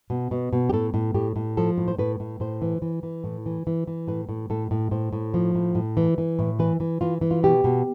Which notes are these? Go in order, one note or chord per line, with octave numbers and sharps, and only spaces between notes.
B2
B2
B2
G4
A2 A4
A2
A2 G4
A2
F3 A4
A2
C5
A2 B4
A2
A2 C5
E3
E3
E3
A2
E3
E3
E3
A2 B4
A2
A2 A4
A2
A2 C5
A2
F3
A2
A2
E3
E3
A2
E3 B4
E3
E3 F4
E3
F4
B2 G4
B2